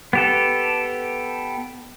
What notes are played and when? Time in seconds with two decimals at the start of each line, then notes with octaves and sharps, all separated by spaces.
0.13 B3 G4 A4